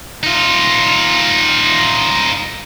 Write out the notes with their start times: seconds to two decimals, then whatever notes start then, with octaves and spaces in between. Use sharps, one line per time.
0.23 D#4 F4